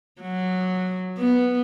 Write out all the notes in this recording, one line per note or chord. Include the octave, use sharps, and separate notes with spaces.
F#3
B3